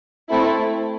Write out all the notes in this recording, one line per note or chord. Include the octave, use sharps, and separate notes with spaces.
A3 C4 E4 A4